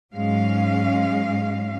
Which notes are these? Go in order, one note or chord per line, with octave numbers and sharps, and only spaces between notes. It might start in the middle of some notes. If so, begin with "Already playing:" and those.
G#2 F#3 G#3 C#4 F5